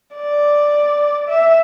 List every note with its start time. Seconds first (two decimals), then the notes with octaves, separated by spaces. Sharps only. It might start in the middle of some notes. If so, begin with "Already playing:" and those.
0.15 D5
1.28 E5